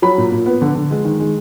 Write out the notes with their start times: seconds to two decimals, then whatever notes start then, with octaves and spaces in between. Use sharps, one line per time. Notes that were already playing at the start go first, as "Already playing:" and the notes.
0.02 F#3 B5
0.18 A#2
0.32 A#2
0.46 B3
0.62 D3
0.75 D3
0.91 G#3
1.05 D#3
1.20 G#3